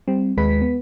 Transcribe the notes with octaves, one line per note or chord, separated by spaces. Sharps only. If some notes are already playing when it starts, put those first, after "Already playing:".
G3 C4
D#2 G#3 B4 B6
B3